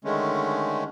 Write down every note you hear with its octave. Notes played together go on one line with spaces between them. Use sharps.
D3 D#3 G#3 A3 C#4